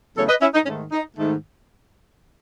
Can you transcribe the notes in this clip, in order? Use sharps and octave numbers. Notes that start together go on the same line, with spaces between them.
E2 C#3 F#3 A3 A4 C#5
B4 D#5
C#4 E4
D#4
G#2 D#3 A3 C#4
D#4
G#2 D#3 A3